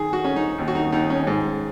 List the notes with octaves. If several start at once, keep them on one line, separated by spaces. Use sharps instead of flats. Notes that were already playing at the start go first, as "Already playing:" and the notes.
Already playing: D#3 G#4
F#4
C#4
D#4
D#2
F#4
D#4
D#2 D#4
C#4
G#2